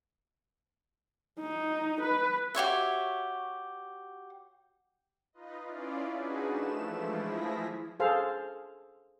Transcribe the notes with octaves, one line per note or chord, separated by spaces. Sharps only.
D#4
B4
F#4 G4 C#5 E5
D#4 F4 B4 D#5
C#4 E4 F4 D5
D4 D#4 F#4 G#4 B4
F3 A3 E7
E3 F3 G#3 A3 E4
F3 E4 G#4 A#6 B6
G#4 A4 C5 F5